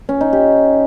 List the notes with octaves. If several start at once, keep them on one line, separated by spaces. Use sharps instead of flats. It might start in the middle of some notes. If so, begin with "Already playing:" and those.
C#4
D#4
G4